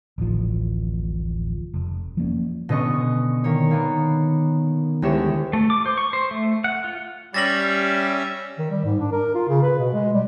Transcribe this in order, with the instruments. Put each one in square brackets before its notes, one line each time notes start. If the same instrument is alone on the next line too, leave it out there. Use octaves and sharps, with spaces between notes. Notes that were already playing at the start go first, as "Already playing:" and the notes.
[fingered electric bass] D1 A1 F3
F1
F3 A#3 C#4
[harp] B2 D3 C#4 D#5 C#6
D#3 A#3 C#5
A#3 B3
D2 G#3 E4 G4 C#5 E7
[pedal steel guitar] A3
D6
C5
C#6
C5
A3
F#5
F4
[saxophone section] G3 [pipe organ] C#4 E5 [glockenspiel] A6 A#6 F#7
[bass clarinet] D#3
G3
G#2
D4
A#4
F4
C#3
B4
B2
G#3
G3